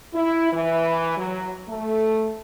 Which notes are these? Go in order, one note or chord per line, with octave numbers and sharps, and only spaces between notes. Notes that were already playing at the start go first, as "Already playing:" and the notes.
E4
E3
F#3
A3